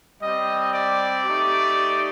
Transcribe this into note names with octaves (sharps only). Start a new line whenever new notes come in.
G3 C4 G4 D#5
D5
A3 D#4 G4